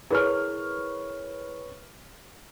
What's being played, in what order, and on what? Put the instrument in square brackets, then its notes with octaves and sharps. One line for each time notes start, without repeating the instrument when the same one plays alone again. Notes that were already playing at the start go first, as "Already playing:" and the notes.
[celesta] E4 G#4 A#4 [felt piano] B4 C#5 F6